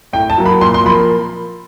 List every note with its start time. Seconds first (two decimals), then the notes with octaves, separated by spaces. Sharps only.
0.13 A2 G5
0.30 A5
0.38 F#3 A#3
0.46 B5
0.61 A#2 C6
0.74 C6
0.86 F3 A#3 B5